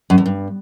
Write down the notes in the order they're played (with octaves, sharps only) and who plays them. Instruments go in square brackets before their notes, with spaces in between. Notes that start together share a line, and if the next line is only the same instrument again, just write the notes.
[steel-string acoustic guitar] F#2
E2
G2